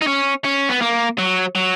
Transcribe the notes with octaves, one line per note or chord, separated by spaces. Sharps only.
D#4
C#4
C#4
B3
A#3
F#3
F#3